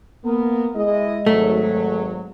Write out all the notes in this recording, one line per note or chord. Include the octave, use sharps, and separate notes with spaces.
A#3 B3 A#4
G#3 E4 D#5
G#1 F#3 A3